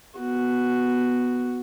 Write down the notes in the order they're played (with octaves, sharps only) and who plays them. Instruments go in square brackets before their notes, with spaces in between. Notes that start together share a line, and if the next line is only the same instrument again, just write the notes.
[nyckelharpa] B3 F#4